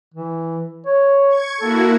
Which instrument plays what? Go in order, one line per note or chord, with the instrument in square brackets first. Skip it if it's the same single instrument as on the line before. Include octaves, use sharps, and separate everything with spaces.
[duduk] E3
C#5
[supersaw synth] C#6 G#6
[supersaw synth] A#3 E4 F#4 [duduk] A4